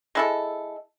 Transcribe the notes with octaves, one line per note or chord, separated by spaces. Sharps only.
G#3 E4 A4